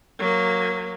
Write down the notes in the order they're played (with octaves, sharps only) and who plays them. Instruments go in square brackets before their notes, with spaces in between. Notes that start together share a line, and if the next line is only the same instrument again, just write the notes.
[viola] F#3 A#3